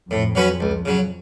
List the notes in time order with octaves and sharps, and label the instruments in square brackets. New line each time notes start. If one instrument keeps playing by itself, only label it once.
[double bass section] F2 [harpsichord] A2
[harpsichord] F#3 C#4 F#4 B4
C#2
C#3 F#3